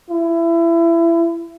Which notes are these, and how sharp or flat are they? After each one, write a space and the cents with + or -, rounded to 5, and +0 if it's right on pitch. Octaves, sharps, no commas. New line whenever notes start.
E4 +25